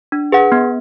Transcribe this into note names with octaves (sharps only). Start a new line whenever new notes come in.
D4
G#4 B4 F#5
B3